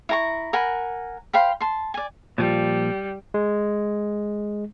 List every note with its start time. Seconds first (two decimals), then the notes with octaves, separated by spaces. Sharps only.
0.09 E4 A#5 C#6
0.53 A#4 F#5 G#5 B5
1.33 C5 F5 G5 B5
1.60 A5 C6
1.94 D5 G#5
2.38 A#2 F3 G3
3.34 G#3